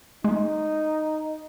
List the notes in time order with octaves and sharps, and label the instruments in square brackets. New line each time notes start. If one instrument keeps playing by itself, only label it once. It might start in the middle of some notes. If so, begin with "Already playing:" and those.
[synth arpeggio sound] G#3 [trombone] D#4